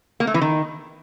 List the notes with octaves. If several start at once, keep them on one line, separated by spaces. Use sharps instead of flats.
A#3
A3
E3
D#3